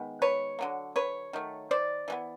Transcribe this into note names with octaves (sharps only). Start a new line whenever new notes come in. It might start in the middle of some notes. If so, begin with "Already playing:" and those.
Already playing: D#3 G#3 B3
B4 C#5
D3 F#3 A#3
B4 C#5
D#3 F#3 A3
C5 D5
E3 G#3 B3